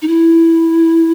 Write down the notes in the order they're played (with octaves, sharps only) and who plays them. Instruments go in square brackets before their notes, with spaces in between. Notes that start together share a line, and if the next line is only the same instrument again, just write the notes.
[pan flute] D#4
E4